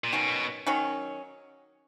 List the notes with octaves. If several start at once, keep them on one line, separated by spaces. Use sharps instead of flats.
A#2
B2 D#3 F#3 C#4
D#3 F#3 C#4